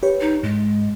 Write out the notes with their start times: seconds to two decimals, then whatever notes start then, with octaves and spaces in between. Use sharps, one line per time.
0.03 G4 B4 C#5
0.21 D#4
0.43 G#2 G#3